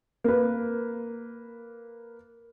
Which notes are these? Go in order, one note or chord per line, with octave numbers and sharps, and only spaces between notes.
A#3 B4